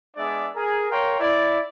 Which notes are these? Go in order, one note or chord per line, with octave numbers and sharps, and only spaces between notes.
G#3 B3 D4 G#4 D5 E5
G#4 A#4
A#4 C#5 F5 G5 A#5 C6
E4 D5